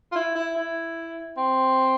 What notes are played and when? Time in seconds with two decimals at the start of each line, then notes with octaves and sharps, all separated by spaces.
0.12 F4
0.15 E4
0.35 E4
0.56 E4
1.37 C4